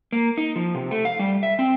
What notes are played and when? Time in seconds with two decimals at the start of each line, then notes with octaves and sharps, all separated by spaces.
0.12 A#3
0.37 D#4
0.56 F3
0.75 C3
0.91 A3
1.05 F5
1.19 G3
1.43 E5
1.59 C4